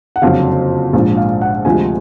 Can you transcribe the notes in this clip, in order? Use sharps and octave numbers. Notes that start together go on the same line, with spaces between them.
F#5
F#1 F2 D3 F#3 F5
A#1 G#2 F3
F5
F#5
D2 C3 F3 G#3 G#5